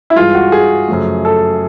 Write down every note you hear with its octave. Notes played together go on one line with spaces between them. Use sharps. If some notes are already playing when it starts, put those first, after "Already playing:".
E4
G2 E3 G#3 F4
F#4
G#4
F#2 C#3 F3 A3
A4